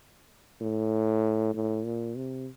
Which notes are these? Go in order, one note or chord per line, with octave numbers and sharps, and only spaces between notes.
A2
A2
A#2
C3